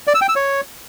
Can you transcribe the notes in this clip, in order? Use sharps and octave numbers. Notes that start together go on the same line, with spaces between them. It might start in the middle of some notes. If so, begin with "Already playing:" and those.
D5
E6
G5
E6
C#5